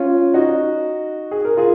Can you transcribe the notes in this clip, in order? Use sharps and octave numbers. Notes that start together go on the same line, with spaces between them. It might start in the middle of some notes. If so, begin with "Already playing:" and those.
Already playing: C#4 F4
D#4 F#4
G#4
A#4
F4 G#4